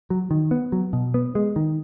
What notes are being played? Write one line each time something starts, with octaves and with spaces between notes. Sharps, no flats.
F#3
D#3
B3
F#3
B2
B3
G#3
D#3